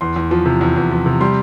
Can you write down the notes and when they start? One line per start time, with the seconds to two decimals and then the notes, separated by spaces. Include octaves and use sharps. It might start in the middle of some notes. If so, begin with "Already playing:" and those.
0.01 E2 C6
0.16 E2
0.31 F3
0.46 C3
0.61 E2
0.76 E2
0.91 F3
1.06 C3
1.21 G3 C6